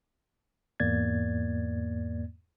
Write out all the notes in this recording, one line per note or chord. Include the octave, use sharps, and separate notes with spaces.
E2 G#2 A#3 D5 G#6 A6